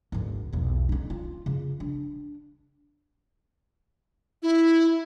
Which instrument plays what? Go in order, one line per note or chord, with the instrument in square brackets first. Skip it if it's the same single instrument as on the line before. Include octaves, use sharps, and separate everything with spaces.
[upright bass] G#1 D2
B1 E2
C#4 D#4
F4
C#3
D4
[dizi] E4